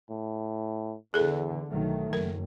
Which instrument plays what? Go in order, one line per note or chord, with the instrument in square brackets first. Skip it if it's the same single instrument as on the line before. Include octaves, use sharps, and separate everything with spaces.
[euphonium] A2
[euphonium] E2 [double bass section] D3 E3 [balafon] G#4 A4
[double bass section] B1 D#3 F#3 [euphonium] A3
[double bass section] F#1 [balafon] A#4